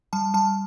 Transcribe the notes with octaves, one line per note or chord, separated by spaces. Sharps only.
G3 A5
G3 A5